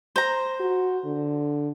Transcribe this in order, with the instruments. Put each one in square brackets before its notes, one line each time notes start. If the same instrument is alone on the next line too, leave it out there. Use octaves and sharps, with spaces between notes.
[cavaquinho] C5 A#5
[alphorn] F#4
D3